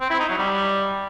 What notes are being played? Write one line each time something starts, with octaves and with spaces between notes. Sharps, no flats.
C4
E4
D#4
F#3
G3